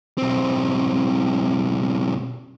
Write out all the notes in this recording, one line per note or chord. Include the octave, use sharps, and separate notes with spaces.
B1 C4